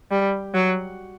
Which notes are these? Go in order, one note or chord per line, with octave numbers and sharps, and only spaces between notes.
G3
F#3